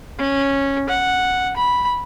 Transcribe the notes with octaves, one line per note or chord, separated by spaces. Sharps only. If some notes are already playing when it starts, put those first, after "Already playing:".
C#4
F#5
B5